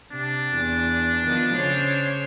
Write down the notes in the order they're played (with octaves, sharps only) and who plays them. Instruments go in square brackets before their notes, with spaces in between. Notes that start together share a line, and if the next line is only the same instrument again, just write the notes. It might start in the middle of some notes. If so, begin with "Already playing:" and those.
[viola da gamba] C3 [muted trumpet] D4
[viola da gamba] E2
D#3 F3 B3
C#3 C5 C#5